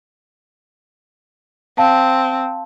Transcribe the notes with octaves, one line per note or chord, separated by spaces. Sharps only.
C4 F5 A5